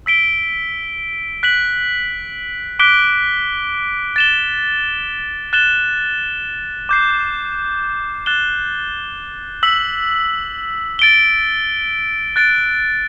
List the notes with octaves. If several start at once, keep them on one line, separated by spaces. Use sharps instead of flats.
E6 B6 D7 G7
F#6 B6 F#7
D6 F#6 B6 D7 G7
A6 E7 G7
F#6 A6 E7 G7
D6 G6 C7
F#6 A6 E7 G7
E6 B6 F#7
A6 D7 G7
F#6 A6 D7